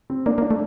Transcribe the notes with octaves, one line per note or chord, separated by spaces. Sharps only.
C4
A#3 D4
A#3
D4
A3